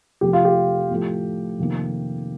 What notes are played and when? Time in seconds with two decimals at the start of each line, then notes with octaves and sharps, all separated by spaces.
0.21 F2 C3 F3 A3 G4
0.33 F4
0.45 G4
0.90 A2 F3 A3
1.59 F2 C3 D#3 A#3